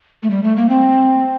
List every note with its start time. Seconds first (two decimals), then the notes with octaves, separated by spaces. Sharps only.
0.23 A3
0.31 G3
0.44 A3
0.57 A#3
0.69 C4